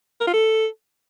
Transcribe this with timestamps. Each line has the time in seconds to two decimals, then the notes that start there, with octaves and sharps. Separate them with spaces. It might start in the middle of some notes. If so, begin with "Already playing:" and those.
0.21 A#4
0.27 F4
0.33 A4